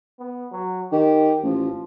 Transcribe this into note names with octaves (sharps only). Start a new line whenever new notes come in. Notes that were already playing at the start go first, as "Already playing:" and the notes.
B3
F#3
D#3 G4
A1 F3